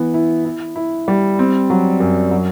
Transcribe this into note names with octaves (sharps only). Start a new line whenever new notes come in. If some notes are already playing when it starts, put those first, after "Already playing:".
Already playing: E3 B3
E4
E4
E4
G3
C4
F#3
F#2
F#3